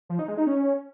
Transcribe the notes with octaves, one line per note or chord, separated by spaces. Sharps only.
F3
D#4
G#3
D#4
C#4